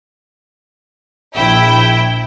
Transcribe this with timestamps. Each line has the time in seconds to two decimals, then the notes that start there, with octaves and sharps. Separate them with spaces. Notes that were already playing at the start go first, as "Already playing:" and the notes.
1.35 A#1 E4 G5